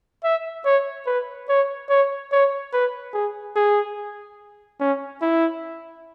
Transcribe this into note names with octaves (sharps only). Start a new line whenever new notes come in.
E5
C#5
B4
C#5
C#5
C#5
B4
G#4
G#4
C#4
E4